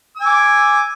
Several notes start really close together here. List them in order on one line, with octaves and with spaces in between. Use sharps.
E6 G#5 D6